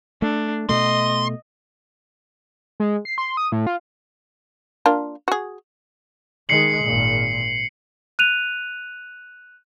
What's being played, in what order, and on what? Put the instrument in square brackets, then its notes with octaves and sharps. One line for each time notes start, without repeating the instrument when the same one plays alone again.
[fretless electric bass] A3 [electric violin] D4
[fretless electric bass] B2 A3 [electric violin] D#5 [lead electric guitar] C6
[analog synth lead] G#3
C7
C6
D#6
A2
F4
[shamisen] A#3 D4 F4
F#4 G#4
[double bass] D#3 G#3 [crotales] C7 C#7 F#7
[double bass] G#1 A#2
[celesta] F#6 D#7 F7